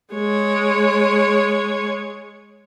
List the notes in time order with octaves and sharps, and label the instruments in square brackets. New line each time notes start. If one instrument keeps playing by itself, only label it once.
[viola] G#3 C#5